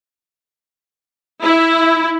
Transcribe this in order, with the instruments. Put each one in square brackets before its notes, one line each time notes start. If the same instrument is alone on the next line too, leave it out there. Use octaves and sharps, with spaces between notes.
[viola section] E4